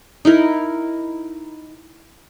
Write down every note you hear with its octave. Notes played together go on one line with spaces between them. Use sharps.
D#4 E4 A#4